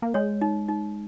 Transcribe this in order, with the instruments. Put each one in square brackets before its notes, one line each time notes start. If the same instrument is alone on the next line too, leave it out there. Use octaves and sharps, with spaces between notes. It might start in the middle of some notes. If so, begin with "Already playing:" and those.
[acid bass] A#3
[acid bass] G#3 [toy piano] C#5
[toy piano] D#4
D#4